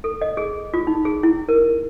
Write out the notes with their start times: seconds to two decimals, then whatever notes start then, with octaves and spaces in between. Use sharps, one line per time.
0.04 A4
0.22 D#5
0.37 G#4
0.74 F4
0.87 D#4
1.05 G#4
1.23 E4
1.49 A#4